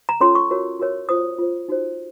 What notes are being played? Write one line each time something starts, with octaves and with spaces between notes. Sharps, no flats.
A#5
C#4 F4 A4 C#5 C6
C#6
F#4 A#4 C#5
F#4 A#4 C#5
F4 C5 D#6
F4 C5
D#4 F#4 C5